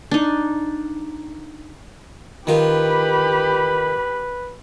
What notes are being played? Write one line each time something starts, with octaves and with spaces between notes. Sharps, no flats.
D4 D#4
D#3 F4 G4 B4 B5